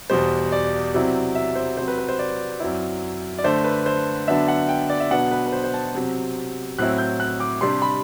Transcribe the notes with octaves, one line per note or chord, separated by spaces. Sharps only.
E2 B2 G3 C5
D5
C3 F#3 C4 E4
E5
C5
C3 F#3 C4 C5
B4
B4
C5
D5
F#2 F#3 C4 E4
D5
D3 A3 D4 C5
B4
C5
D3 F#3 B3 D4 E5
F#5
G5
D5
E5
B2 F#3 B3 D4 F#5
B4
B4
C5
C5
A5
C3 F#3 C4
A2 F#3 C4 E4 F#6
G6
F#6
D6
C3 G3 D4 C6
B5